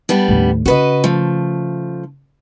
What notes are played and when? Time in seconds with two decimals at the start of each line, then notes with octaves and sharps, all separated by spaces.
0.09 G3 B3 D4
0.28 D#2 A2
0.66 C#3 F#4 B4 D#5
1.04 F3 A3